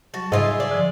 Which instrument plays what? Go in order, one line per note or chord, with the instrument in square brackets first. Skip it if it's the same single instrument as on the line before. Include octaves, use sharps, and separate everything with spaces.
[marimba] F#3 G3 [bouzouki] F#4 [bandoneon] A5
[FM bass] G#2 [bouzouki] C#3 F4 D#5 [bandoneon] G#4 E5 C6
[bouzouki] D5
[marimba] D3 F3